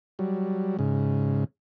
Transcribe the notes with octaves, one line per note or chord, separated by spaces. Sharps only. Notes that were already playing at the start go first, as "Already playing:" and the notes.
F#3 G3
G#2 C#3